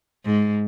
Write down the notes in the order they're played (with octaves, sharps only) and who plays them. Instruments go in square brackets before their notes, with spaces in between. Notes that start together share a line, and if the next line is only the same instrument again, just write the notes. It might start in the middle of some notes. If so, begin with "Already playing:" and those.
[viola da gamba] G#2